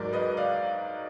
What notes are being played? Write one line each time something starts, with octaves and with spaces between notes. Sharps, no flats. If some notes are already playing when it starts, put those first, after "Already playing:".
Already playing: G#2 F#3 A#4 D5
B4 D#5
D5 F5